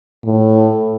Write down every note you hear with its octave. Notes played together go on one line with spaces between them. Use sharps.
A2